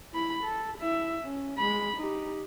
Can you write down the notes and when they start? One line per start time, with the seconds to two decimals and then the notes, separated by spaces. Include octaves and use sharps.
0.13 E4 B5
0.44 A4
0.78 E4 E5
1.24 C#4
1.57 G#3 B5
1.96 D#4 G4